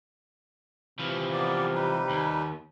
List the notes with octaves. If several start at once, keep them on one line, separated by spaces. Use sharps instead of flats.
C3 E3 F3
A#3 B3 D5
G3 D#4 B4
D#2